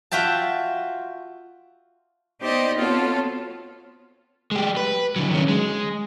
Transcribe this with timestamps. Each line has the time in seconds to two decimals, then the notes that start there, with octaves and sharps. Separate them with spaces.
0.11 F4 F#4 E5 G5 A5
2.40 B3 D#4 G4 C5 D5 D#5
2.77 B3 C4 F4 F#4 A4 C#5
4.51 G#3 G4
4.77 B4
5.16 D3 F#3
5.31 D#3 C#4
5.48 G#3